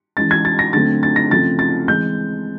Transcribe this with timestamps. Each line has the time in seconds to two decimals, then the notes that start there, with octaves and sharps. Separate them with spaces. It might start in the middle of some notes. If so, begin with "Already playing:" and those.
0.17 E3 G#3 C#4 A6
0.31 G#6
0.45 A6
0.59 A#6
0.73 D3 F#3 A3 C4 A6
1.03 A6
1.16 A#6
1.30 C#3 F3 A3 C4 A6
1.59 A6
1.88 E3 G#3 C4 G6